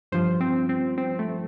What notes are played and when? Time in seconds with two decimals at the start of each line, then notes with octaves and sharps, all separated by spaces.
0.12 G2 F3 C5
0.40 C4
0.69 C4
0.98 C4
1.19 A3